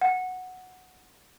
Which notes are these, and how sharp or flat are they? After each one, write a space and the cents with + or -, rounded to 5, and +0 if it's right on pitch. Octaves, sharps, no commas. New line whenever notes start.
F#5 -5